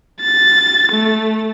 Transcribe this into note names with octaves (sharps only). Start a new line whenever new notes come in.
A6
A3